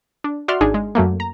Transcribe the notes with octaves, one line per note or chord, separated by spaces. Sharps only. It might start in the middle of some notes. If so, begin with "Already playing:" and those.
D4
F#4 D5 E5 F#5 C6 F6
G#1 D4 D#4 G#4 G#5
G#3
F#2 F#3 A3 A#3
A#5